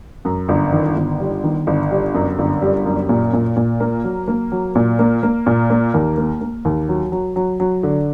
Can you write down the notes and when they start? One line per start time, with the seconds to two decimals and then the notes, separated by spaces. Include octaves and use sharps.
0.25 F#2
0.49 G1
0.72 D#3
0.96 G1
1.20 G3
1.44 D#3
1.67 G1
1.91 G3
2.15 F#2
2.38 G1
2.62 G3
2.85 F#2
3.09 A#2
3.33 A#2
3.57 A#2
3.80 A#3
4.04 F#3
4.28 A#3
4.52 F#3
4.75 A#2
4.99 A#3
5.23 A#3
5.46 A#2
5.70 A#3
5.94 D#2
6.18 A#3
6.41 A#3
6.65 D#2
6.88 F#3
7.12 F#3
7.36 F#3
7.60 F#3
7.83 D3